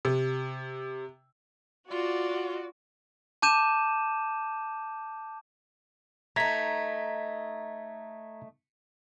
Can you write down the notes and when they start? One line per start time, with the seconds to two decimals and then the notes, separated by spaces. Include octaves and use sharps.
0.05 C3
1.90 F4 F#4 D5
3.42 A5 D6 G6 D#7 E7
6.36 A3 D#4 A#5 G#6 B6